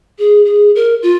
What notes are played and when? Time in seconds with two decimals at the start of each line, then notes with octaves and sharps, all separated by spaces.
0.19 G#4
0.45 G#4
0.75 A#4
1.03 F4